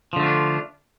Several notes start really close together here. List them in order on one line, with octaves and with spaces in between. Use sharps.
F3 D3 A3 F4 D4